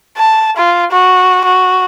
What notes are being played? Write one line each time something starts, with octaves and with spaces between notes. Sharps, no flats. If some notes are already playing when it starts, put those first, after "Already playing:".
A5
F4
F#4
F#4